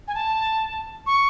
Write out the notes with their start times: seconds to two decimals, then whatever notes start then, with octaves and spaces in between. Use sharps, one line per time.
0.08 G#5
0.15 A5
1.06 C#6